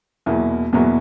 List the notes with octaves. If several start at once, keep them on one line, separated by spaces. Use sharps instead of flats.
E2 B2 F#3 A#3 E4
E2 B2 F#3 A#3 E4